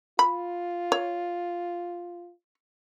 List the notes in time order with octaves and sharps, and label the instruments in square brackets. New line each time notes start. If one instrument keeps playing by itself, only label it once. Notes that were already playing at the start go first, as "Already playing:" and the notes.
[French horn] F4 [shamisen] B5
[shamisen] C#5